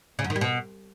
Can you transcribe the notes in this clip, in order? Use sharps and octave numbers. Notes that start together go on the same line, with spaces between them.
C#3
F#2
D#3
G3
B2